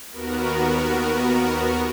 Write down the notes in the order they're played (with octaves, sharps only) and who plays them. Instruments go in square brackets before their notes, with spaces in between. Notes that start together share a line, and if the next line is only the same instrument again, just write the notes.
[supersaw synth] D#2 B3 F#4 A#4